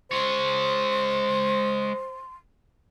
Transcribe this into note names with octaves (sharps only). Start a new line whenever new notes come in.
G#3 C5 C#5 C6